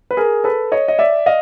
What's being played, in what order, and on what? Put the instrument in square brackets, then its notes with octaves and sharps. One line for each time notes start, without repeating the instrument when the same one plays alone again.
[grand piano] B4
G#4 A#4
A4 B4
C#5 D#5
D#5
D5 E5
D#5 F5